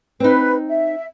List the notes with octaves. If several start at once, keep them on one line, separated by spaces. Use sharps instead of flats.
C4 D#4 B4
E5